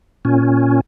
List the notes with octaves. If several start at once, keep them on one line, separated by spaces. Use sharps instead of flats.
A#2 C#4